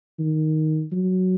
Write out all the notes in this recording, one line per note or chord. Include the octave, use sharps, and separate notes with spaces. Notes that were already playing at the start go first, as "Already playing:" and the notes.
D#3
F#3